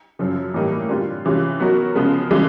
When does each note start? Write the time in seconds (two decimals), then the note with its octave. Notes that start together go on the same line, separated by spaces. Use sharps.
0.19 F#2 C#3 F3
0.54 A2 E3 G3 A#3 D#4
0.89 D3 G3 C4 F4
1.25 C3 E3 G#3 C#4 F4
1.60 F#3 B3 D#4 F#4 A#4
1.95 C#3 F3 G#3 B3
2.31 C#3 E3 G#3